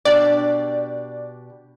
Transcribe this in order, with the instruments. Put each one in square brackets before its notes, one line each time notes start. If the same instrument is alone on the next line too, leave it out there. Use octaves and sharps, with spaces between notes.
[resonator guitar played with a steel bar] B2 D4 G4 [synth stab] D5